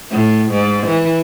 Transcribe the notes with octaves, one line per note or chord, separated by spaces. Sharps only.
A2
G#2
E3